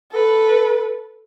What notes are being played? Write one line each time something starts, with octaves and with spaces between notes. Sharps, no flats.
A4 B4